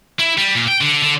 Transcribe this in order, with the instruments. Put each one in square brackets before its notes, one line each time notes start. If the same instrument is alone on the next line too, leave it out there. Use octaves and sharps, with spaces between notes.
[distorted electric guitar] E4
G3
A#2
G5
D3
D3